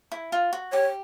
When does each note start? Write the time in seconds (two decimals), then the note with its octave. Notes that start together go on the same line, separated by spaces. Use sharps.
0.12 E4
0.32 F4
0.53 F#4
0.72 G4 C#5